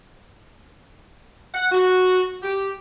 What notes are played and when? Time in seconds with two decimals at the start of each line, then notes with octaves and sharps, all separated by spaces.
1.55 F#5
1.72 F#4
2.43 G4